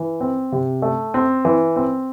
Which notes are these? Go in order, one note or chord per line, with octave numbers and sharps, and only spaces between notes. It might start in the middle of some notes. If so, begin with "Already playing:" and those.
Already playing: E3
C4
C3
A3
C4
E3
C4